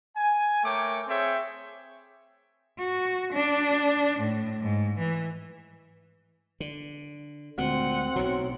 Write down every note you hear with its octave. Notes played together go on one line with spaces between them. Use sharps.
G#5
A3 A#4 C#5 G5 D6
C4 G#4 C#5 E5 G5
F#4
D4
A2
G#2
E3
D3
D2 A#2 G#3 C4 F#5
B1 A2 F#3